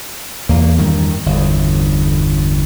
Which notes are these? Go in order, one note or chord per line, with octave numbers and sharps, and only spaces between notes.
E2 A#3
E2 G2 D#3
G1 E2